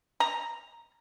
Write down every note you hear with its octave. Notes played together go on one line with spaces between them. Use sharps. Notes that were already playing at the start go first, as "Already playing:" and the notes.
A#5